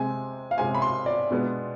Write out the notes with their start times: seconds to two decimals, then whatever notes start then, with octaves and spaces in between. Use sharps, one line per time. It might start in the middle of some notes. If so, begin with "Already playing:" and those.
Already playing: C3 G#3 C4 G#5
0.51 F5
0.58 C3 G#3 C4 G#5
0.75 B5
0.82 C6
1.06 D5
1.31 B2 G#3 B3 D4